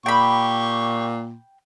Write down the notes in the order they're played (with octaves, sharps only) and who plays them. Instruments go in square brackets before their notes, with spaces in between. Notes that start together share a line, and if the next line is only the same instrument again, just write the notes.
[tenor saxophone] A#2 [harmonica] G4 C#6 [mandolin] G5 B5